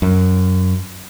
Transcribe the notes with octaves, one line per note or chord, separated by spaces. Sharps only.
F#2